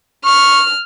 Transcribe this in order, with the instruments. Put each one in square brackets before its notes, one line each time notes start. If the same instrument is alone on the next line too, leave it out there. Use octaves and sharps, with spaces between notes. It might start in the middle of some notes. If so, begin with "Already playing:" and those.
[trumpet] C#6 [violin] F6